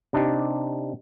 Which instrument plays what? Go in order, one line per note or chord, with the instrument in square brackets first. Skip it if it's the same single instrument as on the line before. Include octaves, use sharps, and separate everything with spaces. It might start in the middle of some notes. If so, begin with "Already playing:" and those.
[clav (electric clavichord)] C3 D4 D#4 G4